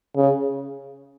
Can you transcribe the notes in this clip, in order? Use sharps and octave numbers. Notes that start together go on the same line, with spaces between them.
C#3